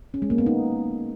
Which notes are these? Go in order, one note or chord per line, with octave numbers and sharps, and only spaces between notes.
C#4
G#3
A#3
B3
D#4